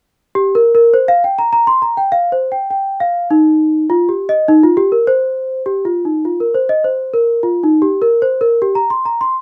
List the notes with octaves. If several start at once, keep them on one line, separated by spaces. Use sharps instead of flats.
G4
A#4
A#4
C5
F5
G5
A#5
A#5
C6
A#5
G5
F5
C5
G5
G5
F5
D#4
F4
G4
D#5
D#4
F4
G4
A#4
C5
G4
F4
D#4
F4
A#4
C5
D#5
C5
A#4
F4
D#4
G4
A#4
C5
A#4
G4
A#5
C6
A#5
C6